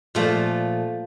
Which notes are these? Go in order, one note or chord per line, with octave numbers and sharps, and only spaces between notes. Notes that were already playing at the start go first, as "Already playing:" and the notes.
A#2 F3 A3